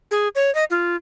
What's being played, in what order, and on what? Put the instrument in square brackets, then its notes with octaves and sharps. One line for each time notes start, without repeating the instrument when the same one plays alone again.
[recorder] G#4
C#5
D#5
F4